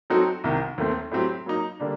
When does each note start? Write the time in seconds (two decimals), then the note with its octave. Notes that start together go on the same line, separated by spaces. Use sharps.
0.10 F#3 C4 D#4 F#4 A4
0.44 C2 C3 D#3
0.78 D#2 D#3 A3 C4
1.11 A2 F#3 C4 G4
1.46 F#3 A#3 D#4
1.80 D3 G3 A#3 D4